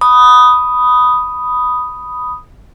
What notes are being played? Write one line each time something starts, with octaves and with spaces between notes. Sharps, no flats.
B5 D#6